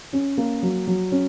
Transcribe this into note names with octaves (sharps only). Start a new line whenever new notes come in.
C#4
A#3
F#3
F#3
C#4